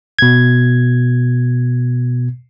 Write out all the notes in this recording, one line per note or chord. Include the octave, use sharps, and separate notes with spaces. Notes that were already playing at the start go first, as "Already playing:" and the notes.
B2 G#6